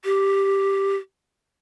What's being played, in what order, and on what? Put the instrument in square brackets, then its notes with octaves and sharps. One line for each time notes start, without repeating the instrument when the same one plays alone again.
[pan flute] G4